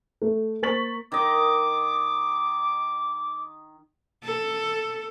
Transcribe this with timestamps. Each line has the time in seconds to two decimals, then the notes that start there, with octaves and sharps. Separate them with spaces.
0.22 A3
0.62 A#3 C5 C#6 A6 B6 F#7
1.12 D#3 D#5 D6
4.24 A4